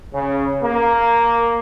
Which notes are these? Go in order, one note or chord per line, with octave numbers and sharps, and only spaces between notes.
C#3
A#3